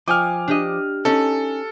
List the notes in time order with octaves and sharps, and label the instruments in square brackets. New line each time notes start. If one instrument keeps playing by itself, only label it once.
[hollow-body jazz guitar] F3 [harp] D#5 G5 G#5 [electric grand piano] D6 F6
[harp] D4 G4 D#5
[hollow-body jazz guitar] C#4 D#4 [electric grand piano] A4